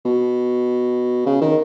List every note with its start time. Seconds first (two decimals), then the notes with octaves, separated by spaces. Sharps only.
0.05 B2
1.26 C#3
1.41 D#3